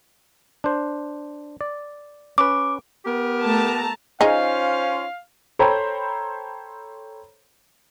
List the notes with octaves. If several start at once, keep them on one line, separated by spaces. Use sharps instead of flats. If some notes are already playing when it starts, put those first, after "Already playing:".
D4 C5
D5
C#4 B4 D6
B3 G4 A#4
A3 A5 A#5
C#4 D#4 F4 G#4 C5 F5
A4 C5 C#5 G5 A#5 B5